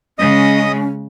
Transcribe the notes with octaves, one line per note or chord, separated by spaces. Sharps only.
C#3 G#3 C#4 D#5 D#6